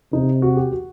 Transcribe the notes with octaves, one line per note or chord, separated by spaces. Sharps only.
C3 D#4
F#4
G4
F#4